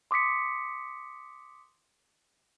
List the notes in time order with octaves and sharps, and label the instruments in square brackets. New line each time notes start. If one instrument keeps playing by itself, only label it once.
[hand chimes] C6 D6 D#6 B6 C#7